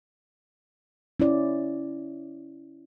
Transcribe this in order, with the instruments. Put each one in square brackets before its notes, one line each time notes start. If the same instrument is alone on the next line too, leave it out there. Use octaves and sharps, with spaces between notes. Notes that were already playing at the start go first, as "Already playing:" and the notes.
[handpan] C#4 E4 D5